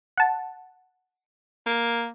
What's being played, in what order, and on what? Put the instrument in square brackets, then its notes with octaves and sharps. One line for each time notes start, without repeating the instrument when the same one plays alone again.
[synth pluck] F#5 A5
[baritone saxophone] A#3